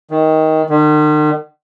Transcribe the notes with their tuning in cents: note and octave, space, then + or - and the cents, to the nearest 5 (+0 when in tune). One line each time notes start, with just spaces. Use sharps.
D#3 +15
D#3 -45